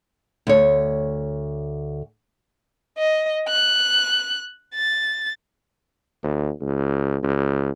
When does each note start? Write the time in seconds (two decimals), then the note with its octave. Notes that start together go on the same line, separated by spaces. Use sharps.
0.47 D2 C#5
2.98 D#5
3.49 F#6
4.75 A6
6.23 D2
6.61 C#2
7.23 C#2